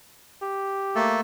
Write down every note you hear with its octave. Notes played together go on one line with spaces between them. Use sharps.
G4
A3 A#3 A4